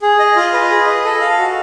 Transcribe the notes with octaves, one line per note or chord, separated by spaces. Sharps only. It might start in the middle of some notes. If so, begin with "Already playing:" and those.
G#4
D#5
F4
B4
G#4
D#5
A4
F5
F#4